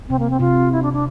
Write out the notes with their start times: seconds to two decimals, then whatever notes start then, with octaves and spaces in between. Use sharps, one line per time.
0.09 C3 C4
0.19 A#3
0.30 C4
0.40 C3 F4
0.72 E4
0.83 D4
0.93 D4